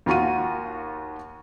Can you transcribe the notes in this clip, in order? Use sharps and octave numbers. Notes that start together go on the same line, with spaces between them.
D#2 F4 F#4 C#6 D#7